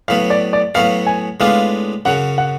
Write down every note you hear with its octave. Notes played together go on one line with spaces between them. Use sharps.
A2 F#3 B3 F5
D5
D5
A2 F#3 B3 F#4 F5
G#5
A2 G#3 B3 D4 F4 F5
F#2 C#3 F#3 F#5
F#5